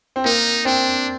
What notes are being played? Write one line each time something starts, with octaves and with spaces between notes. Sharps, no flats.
C4
A#3 D#4
C4 D4